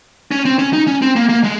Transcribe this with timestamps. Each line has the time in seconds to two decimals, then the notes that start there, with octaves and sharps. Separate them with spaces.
0.31 C#4
0.45 C4
0.59 C#4
0.73 D#4
0.87 C#4
1.02 C4
1.16 A#3
1.29 A#3
1.44 G#3